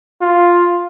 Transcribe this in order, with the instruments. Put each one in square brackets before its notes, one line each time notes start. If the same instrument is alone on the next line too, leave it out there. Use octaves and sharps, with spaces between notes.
[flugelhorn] F4